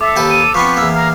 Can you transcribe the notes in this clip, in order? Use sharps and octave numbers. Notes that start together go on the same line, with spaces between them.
A4 E5 D6
D#2 G4 B4
D#7
F3 B3 C4 B4 C#6
E2 A#3 E6
F5 A#5